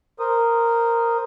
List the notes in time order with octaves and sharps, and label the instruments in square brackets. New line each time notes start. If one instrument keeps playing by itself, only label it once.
[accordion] A#4 C5 D#6